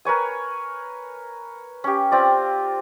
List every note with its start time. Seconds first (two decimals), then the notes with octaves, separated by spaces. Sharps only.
0.05 A#4 B4 C#5 G#5
1.84 C#4 G4
2.12 C4 F4 D5